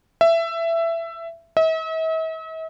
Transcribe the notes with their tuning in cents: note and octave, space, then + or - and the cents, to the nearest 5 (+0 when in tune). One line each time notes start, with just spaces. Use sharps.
E5 +15
E5 -45